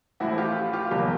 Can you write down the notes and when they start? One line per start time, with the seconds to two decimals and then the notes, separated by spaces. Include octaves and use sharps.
0.20 A1 A2 F3 E4 F#4
0.38 F4 G4
0.73 F4 G4
0.91 F1 E2 B2 F#3 A#3 F4 G4